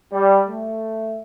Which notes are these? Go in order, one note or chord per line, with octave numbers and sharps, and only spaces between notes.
G3
A3